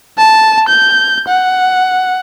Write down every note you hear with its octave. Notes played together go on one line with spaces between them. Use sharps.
A5
G6
F#5